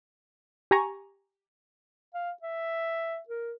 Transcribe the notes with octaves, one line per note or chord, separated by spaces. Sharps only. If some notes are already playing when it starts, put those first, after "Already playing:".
G4 G#5 A#5 C#6
F5
E5
A#4